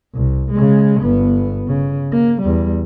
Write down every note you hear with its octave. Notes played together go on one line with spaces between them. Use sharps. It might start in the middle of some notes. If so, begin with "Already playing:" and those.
C2
C#3 G#3
G1 B3
C#3
A#3
E2 G3